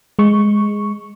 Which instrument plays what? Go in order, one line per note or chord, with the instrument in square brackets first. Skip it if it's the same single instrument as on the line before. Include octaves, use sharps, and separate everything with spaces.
[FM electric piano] G#3 C#6